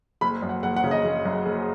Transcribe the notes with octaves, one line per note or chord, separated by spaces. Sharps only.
F#1 B5
F#2
F#5
F#1 F#5
F#5
C#3
D#5
F#1
F#2
F#1